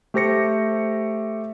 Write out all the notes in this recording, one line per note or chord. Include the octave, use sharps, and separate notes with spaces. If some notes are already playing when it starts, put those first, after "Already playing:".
A3 G4 C5 A#6 C#7